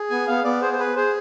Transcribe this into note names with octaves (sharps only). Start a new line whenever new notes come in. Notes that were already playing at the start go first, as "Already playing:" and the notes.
Already playing: G#4
B3 G#5
B3 F5
B3 D5
G#4 C5
C5
G#4 B4
G#4 C5